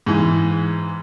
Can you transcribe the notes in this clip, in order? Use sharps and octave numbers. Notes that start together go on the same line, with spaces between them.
G#2 E3